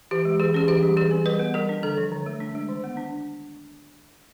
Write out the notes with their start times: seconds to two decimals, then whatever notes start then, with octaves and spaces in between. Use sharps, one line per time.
0.11 E3 G4
0.25 G#3
0.40 E3 G#4
0.54 C#4 G#4
0.68 E3 G4
0.83 G3
0.97 E3 G#4
1.11 C4
1.25 G3 B4
1.39 B3
1.54 G3 A#4
1.69 D4
1.83 D3 A4
1.98 F3
2.12 D3
2.26 A3
2.40 D4
2.55 G#3
2.69 D#3
2.84 B3
2.97 D4